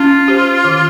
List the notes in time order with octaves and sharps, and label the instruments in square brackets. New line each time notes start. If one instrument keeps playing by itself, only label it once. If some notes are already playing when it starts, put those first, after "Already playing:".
Already playing: [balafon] C#4 [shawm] F4
[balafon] G4 C5
D#3